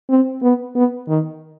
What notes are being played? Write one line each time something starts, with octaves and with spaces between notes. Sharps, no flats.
C4
B3
B3
D#3